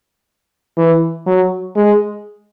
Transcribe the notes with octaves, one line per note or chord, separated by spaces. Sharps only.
E3
F#3
G#3